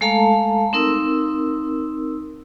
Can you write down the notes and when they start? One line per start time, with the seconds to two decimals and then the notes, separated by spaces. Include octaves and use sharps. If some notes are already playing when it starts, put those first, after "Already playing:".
0.01 G#3 A3 A4 F5 A5 A#5
0.73 C4 D#4 A#4 E6